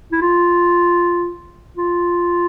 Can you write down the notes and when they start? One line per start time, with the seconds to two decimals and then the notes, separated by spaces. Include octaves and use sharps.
0.12 E4
0.22 F4
1.77 F4